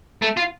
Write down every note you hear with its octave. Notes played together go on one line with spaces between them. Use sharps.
A3
F4